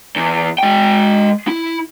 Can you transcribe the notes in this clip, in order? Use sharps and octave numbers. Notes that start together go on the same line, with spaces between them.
E2
G#3 G5
E4